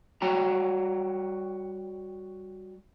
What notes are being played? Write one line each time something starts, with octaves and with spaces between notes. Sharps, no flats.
G3 F#4 C#5 G5 A#5